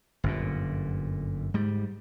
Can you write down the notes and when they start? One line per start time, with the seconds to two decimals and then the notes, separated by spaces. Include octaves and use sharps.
0.24 G1 F#2 A#2
1.54 G#2 G3